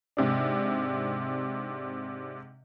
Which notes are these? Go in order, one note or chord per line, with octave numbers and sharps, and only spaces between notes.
G#2 C3 D4